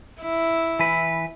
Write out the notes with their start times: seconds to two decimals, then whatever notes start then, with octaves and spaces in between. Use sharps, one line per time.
0.22 E4
0.79 E3 B4